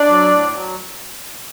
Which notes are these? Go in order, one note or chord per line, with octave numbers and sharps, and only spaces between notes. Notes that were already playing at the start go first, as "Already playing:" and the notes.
Already playing: D4 D5
F#3
A2
F#3